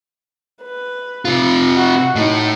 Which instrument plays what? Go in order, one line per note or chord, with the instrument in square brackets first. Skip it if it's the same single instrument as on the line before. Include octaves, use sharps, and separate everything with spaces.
[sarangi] B4
[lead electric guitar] C3 F4
[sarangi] F#4
[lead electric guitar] A2 A3 [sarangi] D#4